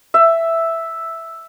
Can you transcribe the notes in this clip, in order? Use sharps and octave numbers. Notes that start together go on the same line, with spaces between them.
E5